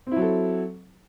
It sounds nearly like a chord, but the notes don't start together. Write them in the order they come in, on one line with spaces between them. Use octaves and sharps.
C4 E4 F#3 A4